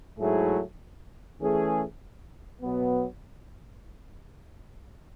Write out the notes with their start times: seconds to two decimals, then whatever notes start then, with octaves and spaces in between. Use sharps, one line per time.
0.18 G#2 F#3 A3 E4 G#4
1.40 E3 A3 C#4 G#4
2.62 B2 F#3 B3